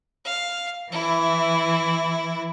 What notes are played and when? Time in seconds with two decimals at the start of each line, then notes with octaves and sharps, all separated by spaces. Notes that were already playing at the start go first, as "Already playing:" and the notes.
0.25 F5
0.92 E3 E4